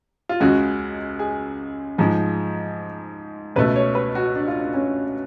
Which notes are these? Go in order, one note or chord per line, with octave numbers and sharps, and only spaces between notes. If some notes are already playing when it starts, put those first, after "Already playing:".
F4
C#2 C#3 G#3 F#4
G#4
G#2 F3 G#3
C#2 B2 A3 B4
C#5
B4
F#4
D4
F4
D4
C#4